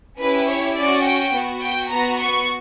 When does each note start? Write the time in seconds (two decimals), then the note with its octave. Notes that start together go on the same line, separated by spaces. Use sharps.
0.20 C#4 E4 G4 B4
0.48 C#5
0.77 C#4 F#4 D5
1.05 G5
1.35 B3 F#4
1.63 G5
1.91 B3 F#4 A#5
2.20 C#6